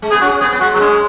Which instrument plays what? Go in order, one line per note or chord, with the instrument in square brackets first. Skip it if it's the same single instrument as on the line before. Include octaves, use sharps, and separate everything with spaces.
[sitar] G#3
[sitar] B3 [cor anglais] G#4
[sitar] C#4 [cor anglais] F#4
[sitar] B3 [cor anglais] G#4
[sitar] B3
[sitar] G#3 [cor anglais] F#4
[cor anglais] F#3 [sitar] B3
[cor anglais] G#3 [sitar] C#4